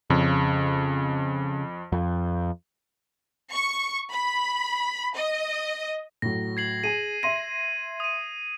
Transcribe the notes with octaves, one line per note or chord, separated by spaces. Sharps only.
F2 C#3
F2
C#6
B5
D#5
A2 F#3 A#6
G#6 C7 F#7
G#4 G#5 D#7
E5 C6 A#6 D#7
D#6 D#7